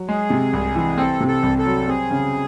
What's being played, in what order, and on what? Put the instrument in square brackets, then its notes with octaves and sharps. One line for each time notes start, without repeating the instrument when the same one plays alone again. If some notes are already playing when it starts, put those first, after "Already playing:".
Already playing: [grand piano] F#3
[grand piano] G#3 [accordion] G#4
[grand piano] C3
C2
E3
[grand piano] C4 [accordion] A4
[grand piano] C3
[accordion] A4
[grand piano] C2
[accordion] A4
[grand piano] F#3
[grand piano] C4 [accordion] G#4
[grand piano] C#3